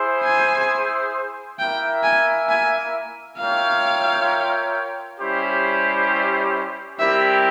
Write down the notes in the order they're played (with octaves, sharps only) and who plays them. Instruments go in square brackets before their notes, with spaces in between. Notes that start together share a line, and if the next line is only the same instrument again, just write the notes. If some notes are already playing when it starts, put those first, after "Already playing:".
Already playing: [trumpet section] E4 G#4 C5
[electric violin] G#5
[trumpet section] A#3 E4 A#4 E5 [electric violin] G5
[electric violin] G#5
G#5
[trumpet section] F4 A#4 C#5 E5 G5 [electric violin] F5
[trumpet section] G3 C#4 E4 G4 C5
[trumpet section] G3 C4 E4 G4 A#4 [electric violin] E5